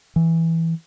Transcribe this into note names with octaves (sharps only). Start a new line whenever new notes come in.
E3